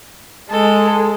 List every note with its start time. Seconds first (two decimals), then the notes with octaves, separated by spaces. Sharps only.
0.51 G#3 A4